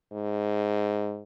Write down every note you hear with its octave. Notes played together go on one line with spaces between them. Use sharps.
G#2